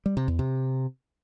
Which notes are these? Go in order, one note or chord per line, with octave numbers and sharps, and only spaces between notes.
G3
C3
E2
C3